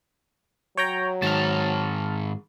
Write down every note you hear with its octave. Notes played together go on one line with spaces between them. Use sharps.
F#3 C#5 G5 A#5
G#2 D#3 A5 F6